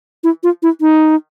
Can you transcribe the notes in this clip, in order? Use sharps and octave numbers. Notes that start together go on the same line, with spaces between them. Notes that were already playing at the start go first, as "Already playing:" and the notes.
E4
F4
E4
D#4